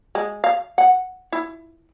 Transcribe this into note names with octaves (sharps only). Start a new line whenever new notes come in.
G#3
F5
F#5
E4